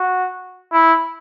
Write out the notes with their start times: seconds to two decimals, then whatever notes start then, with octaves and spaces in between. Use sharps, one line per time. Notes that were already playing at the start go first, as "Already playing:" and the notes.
Already playing: F#4
0.72 E4